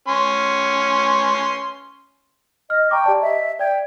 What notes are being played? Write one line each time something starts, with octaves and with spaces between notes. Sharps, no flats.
C#4 C6
D#5 F6
G5 A#5 C#6 D6
G4 D5 A5
D#5 E5
D5 G5 G#6